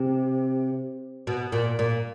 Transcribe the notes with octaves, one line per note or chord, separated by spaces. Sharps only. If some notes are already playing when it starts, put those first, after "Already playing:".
Already playing: C3
B2
A#2
A#2